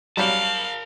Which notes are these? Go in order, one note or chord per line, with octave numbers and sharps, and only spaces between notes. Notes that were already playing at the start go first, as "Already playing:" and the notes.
F#3 G3 A#4 F5 A5